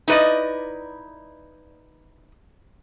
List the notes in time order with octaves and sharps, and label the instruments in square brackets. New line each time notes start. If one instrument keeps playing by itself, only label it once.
[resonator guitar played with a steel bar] D#4 E4 B4 D5 D#5